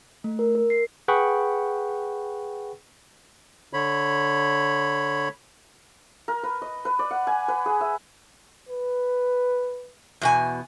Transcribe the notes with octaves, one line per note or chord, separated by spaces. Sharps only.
A3
A#4
A#4
C7
G#4 B4 F#5 G5 B5 C#6
D3 C#5 B5
A#4
B4
D#5
B4
D5
F#5
G#5
B4
G#4
E5
B4
E2 B2 G#5